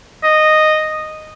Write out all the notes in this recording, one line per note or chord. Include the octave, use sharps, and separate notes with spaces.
D#5